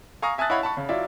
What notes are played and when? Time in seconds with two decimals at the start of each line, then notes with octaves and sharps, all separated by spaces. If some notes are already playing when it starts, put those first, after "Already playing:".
0.22 F5 G#5 A#5 C#6 D#6 A#6
0.38 E5 G#5 A5 D#6 F#6 A6
0.50 E4 C#5 D#5 F5 F#5 B5
0.63 A5 B5 C#6
0.77 C#3
0.89 F#3 E4 F4 D5 E5